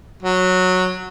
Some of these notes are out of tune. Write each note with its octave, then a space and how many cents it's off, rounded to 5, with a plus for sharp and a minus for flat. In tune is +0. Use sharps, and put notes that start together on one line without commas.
F#3 -10